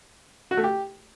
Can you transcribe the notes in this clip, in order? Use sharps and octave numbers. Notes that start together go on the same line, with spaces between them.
F#4
A3
G4